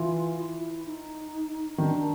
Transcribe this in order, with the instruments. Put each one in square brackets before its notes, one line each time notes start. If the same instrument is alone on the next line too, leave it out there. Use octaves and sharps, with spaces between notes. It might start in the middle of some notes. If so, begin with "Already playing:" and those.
Already playing: [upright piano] E3 [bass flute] F4
[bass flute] E4
D#4
[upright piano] D#3 [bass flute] D4